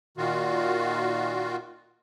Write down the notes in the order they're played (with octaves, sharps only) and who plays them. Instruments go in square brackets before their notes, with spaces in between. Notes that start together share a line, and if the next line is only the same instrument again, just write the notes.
[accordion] A#2 D#3 F4 F#4